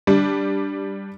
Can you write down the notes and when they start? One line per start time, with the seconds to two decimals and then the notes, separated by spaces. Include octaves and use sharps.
0.07 G3 D4